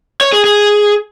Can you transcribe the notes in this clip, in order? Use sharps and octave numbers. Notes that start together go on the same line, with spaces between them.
C#5
G#4
G#4